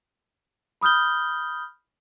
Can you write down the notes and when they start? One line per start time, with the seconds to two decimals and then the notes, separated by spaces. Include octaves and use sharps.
0.81 B5 D#6 F6 G6 G7